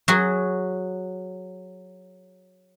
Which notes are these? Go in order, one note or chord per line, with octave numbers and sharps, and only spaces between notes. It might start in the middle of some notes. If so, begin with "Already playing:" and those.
F#3 F#4 G#4